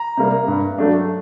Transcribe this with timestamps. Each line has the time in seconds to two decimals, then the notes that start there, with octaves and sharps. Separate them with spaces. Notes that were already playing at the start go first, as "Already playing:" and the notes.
Already playing: A#5
0.17 C3 G3 A#3
0.48 G2
0.78 F#3 A3 D4